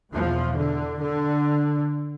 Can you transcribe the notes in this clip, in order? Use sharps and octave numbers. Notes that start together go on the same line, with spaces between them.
E2 B2 F3
D3
D3